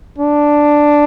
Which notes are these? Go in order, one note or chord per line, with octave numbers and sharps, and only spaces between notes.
D4